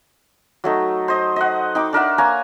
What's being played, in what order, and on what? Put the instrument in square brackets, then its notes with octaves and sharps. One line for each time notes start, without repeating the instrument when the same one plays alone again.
[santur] F#3 A3 D#4
C5 D#5
D#5 F#5
D#4 G5 D6
D4 A#4 E5 F#5
A#3 C#5 G#5 A#5